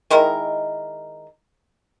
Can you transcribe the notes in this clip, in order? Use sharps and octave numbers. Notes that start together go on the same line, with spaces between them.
D#3 G#3 E4 A#4